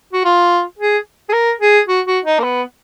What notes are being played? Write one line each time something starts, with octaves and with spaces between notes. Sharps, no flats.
F#4
F4
G#4
G#4
A#4
G#4
F#4
F#4
D#4
A#3
B3